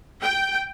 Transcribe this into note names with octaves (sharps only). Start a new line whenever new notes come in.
G5